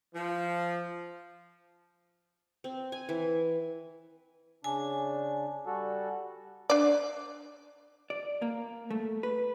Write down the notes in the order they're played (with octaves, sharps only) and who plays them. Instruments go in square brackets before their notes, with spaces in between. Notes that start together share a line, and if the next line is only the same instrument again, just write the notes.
[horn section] F3
[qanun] C4
G#5
E3
[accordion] C#3 D4 [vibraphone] G#5
[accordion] G3 F#4 A4
[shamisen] D4 D5
[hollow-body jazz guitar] D5
A#3
A3
B4